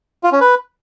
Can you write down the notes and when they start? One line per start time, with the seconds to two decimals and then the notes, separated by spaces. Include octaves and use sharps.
0.23 F4
0.32 C#4
0.41 B4